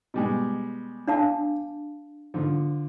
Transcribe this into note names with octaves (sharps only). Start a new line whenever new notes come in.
B2 G3 G#3
D4 F5 A5
D3 F3